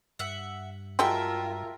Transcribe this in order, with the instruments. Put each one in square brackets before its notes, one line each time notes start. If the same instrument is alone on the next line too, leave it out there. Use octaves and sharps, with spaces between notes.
[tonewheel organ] G2 [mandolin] E5 F#5
[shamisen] F#3 G#3 G4 [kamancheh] F4 A#4 [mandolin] E5 G5 A5